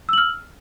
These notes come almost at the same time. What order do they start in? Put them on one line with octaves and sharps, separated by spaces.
E6 F#7 F6